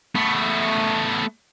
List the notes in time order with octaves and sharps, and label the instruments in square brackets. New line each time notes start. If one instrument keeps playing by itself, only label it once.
[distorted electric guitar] A3 B3